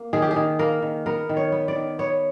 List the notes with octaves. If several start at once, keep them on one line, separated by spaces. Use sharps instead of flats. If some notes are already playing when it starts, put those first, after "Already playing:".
Already playing: A#3
D#3 G#4
G4
G#4
D#3
A#3 A#4
D#3
B3 A#4
D#3
C#5
B3
D5
D#3
B3 C#5